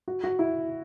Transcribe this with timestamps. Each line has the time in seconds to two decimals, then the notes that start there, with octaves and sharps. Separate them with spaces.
0.08 F#4
0.24 F#4
0.39 E4